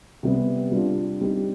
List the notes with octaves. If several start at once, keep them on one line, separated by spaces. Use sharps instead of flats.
C3 G3 B3
G3 D4 F4
G3 C4 D#4 G4